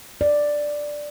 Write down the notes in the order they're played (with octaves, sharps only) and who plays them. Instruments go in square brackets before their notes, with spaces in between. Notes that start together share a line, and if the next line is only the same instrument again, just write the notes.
[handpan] D5